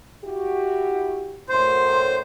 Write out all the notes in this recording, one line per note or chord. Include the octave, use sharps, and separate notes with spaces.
E4 F#4 G4
F#2 A2 C5 C6